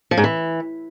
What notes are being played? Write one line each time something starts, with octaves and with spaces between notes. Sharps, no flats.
F3
G#2
E3